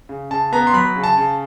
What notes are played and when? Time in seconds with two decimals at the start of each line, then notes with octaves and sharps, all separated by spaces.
0.09 C#3
0.31 C#3 A5
0.53 B3 A#5
0.67 C6
0.74 F#3 B5
0.96 C#3
1.04 A5
1.17 C#3